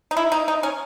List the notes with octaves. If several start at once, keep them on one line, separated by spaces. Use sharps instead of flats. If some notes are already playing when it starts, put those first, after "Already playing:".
D#4
E4
D#4
D#4
C#4